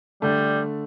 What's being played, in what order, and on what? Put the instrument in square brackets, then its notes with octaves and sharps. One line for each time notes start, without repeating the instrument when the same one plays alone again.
[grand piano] D3 A3 [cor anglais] G3